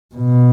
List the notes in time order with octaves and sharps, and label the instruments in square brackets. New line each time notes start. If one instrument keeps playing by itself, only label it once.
[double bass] B2